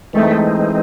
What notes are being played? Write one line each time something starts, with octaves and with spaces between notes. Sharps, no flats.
E3 G#3 A3 C4 D#4